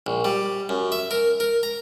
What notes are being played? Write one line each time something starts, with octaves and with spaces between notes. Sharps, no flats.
A#1
G3
F#2
E5
A#4
A#4
A#5